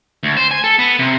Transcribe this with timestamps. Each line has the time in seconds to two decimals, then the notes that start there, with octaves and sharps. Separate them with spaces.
0.23 D2
0.37 C5
0.51 G#5
0.64 A4
0.79 B3
0.99 C3